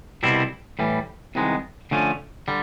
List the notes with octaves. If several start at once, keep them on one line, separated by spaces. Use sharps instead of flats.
C2 B2 G3 C4 E4
A2 E3 G3
C2 C3 D#3 G#3 B3
D3 F3 A3 C#4
D3 G3